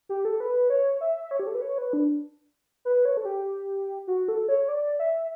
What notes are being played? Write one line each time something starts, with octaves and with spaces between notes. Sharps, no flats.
G4
A4
B4
C#5
E5
C#5
G4
A4
B4
C#5
B4
D4
B4
C#5
A4
G4
F#4
A4
C#5
D5
E5